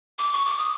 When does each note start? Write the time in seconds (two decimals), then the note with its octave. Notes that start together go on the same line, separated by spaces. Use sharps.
0.18 D6
0.32 C#6
0.45 D6
0.58 D#6